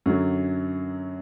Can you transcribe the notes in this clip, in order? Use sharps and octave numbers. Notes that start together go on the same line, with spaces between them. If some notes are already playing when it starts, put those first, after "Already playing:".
F#2 D3 F#3